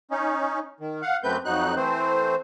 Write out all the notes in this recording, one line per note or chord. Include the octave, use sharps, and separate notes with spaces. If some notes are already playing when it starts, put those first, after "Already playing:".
C#4 D#4
D#3
F5 F#5
F#2 A3 C4 B4 G6
F2 F#3 D#4 F#6
E3 A3 C4 C5